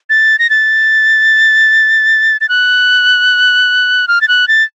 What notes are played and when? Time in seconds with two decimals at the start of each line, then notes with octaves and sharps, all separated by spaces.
0.10 A6
0.39 A#6
0.50 A6
2.41 A6
2.49 F#6
4.08 F6
4.21 A6
4.28 F#6
4.48 A6